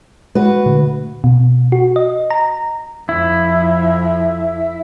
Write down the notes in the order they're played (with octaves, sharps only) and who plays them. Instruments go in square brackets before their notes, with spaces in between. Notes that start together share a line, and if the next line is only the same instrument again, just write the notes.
[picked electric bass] G#3 [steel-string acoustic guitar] F#4 B4
[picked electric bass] A#2 D3 A3
[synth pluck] B2
F#4
D#5
A#5
[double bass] F2 F3 [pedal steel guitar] E4